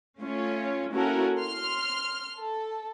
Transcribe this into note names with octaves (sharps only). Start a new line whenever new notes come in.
A3 C#4 F4 C#5
A#3 C#4 E4 F#4 A4 A#4
C6 F6
A4